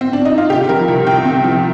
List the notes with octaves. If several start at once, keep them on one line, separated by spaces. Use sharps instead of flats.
C4
D4
D#4
F4
C3 G4
F3 A#4
C2
C2 G5
C3
F3